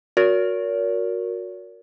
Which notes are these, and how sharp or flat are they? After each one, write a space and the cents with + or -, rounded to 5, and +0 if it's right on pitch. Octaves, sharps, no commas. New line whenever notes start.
F#4 -20 A#4 +5 C#5 +45